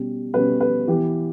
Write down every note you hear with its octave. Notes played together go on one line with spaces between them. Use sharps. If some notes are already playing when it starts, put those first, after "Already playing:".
Already playing: B2 G3 C#4
B2 G3 C#4 B4
B4
E3 B3 G4